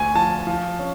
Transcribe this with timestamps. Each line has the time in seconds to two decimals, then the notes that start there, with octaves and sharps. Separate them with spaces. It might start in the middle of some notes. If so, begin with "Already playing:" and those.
Already playing: D2 G#5
0.15 F3 A5
0.47 F3
0.79 C#4